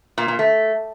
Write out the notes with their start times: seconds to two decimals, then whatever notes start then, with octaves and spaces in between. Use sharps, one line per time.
0.18 A#2
0.28 A#2
0.39 A3